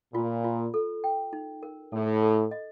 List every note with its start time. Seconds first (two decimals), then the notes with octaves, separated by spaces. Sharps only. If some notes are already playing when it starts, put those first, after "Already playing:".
0.14 A#2 F4
0.44 F4
0.74 A4
1.04 G5
1.33 D#4
1.63 A#4
1.92 A2 A4
2.22 A4
2.51 D#5